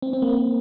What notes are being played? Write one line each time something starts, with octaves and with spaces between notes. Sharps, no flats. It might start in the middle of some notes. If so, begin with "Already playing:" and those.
C4
C4
A#3